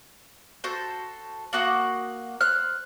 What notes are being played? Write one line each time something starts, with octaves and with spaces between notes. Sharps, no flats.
F#4 A4 C5
A#3 F#4 F#5 D#6
C5 F6 F#6